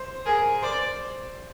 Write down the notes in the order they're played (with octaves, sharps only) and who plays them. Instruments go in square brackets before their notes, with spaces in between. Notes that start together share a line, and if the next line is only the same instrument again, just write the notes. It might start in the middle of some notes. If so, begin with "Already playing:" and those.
Already playing: [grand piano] C5
[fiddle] G#4 [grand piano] A#4
[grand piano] C5 [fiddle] D5